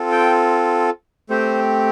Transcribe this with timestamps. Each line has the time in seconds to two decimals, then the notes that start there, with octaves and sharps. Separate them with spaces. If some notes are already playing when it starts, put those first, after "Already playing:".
Already playing: C4 F4 A4
0.12 G5
1.30 A3 C4 G4 C5